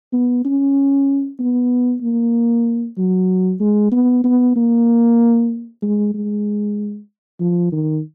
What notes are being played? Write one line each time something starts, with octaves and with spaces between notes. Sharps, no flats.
B3
C#4
B3
A#3
F#3
G#3
B3
B3
A#3
G#3
G#3
F3
D#3